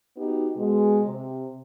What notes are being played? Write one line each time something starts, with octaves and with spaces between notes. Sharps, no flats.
B3 D#4 F#4 G4
B2 G#3
C3